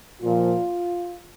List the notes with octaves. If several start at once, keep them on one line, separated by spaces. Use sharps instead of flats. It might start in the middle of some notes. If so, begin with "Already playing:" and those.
A#2 F3 F4